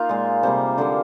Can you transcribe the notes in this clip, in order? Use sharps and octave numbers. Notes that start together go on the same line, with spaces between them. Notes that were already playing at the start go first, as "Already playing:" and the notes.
Already playing: A#3 D#4 F4
A#2 G#3
C3 G3 A#3 C5
D3 F3 A#3 C5